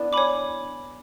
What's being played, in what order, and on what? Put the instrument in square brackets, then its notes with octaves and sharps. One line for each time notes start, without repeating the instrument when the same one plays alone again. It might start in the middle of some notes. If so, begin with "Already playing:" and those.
Already playing: [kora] B3 D4 E4
[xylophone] C#5 G#5 B5 D6